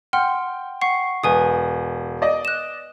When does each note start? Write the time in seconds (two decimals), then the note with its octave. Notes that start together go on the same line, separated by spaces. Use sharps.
0.13 F#5 G5 C6 F6
0.82 F#5 C#6 C7
1.24 E1 B4 G#5 D#6
2.22 D5 D#5
2.45 F#6 E7